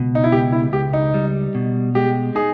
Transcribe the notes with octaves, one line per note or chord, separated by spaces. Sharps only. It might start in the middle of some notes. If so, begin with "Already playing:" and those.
Already playing: C#2 B2
D#4
E4
C#2 G4
E4
C#2 G4
D#4
G3
B2
G#3 G4
D#4 G#4